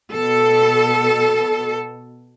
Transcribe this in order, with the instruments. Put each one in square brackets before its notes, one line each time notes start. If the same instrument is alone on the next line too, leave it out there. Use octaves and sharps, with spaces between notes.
[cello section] B2 A4